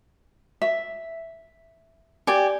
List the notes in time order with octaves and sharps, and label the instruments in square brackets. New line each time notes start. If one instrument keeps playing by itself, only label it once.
[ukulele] E5
[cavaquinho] G4 G#5 [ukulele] D5